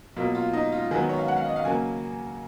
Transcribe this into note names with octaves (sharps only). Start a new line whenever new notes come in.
B2 F#3 A#3 F4
F4
D#4
F4
D#3 F#3 B3 G#4
C#5
F5
F#5
F5
D#5
F5
C#3 F#3 A#3 G#5